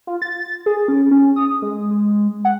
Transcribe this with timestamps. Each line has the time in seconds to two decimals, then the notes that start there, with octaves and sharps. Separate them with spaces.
0.07 F4
0.22 A6
0.66 G#4
0.88 C#4
1.11 C#4
1.36 D#6
1.62 G#3
1.90 G#3
2.45 F#5